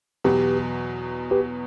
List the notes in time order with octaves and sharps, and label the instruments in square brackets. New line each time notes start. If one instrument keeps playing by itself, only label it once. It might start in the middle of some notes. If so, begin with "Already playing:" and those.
[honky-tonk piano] E2 B2 F#3 [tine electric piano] G4 B4
[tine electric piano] G4 B4